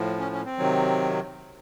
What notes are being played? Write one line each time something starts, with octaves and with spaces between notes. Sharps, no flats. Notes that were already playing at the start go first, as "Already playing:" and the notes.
Already playing: A2 F3
C#4
C#4
C4
C3 D#3 F#3